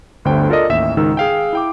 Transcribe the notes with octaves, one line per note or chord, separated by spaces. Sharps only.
G1 D2 D3 C5 G5
F4 A4 A#4 D5 D#5
A1 D#2 E5 E7
C#2 G#2 D#3 E6
G#4 F5 G5
E4 G5 D6